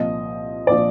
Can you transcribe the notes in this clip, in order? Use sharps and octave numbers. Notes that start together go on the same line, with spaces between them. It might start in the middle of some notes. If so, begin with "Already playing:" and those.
Already playing: C2 A#2 F3 D#5
A#2 F3 D5